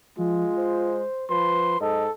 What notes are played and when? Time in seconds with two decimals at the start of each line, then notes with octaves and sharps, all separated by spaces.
0.18 F3 G#3 F4
0.57 C5
1.30 F3 B4 C6
1.81 G#2 A4 D#5